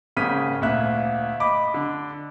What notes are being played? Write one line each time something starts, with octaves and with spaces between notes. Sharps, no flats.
G#1 C#3 A#3 F6 B6 D#7
D2 A#2 E5 F#6
D#5 B5 D6
D3